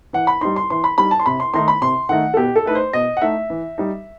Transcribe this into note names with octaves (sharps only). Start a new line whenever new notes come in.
E3 F#5
B5
G3 D#4 C6
C6
E3 C6
B5
G3 D#4 B5
A5
C6
C3 B5
C6
D#3 A3 D#4 C6
B5
C3 C6
D#3 A3 D#4 F#5
A4
B2 G4
A4
A3 D#4 B4
C5
B2 D#5
F#5
A3 D#4 E5
E3
G3 D#4